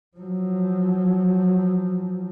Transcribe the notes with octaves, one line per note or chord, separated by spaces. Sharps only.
F3 F#3